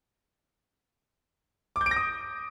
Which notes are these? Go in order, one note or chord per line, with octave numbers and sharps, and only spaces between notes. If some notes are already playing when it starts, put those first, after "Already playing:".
D6
G6
D7
A#6
D#6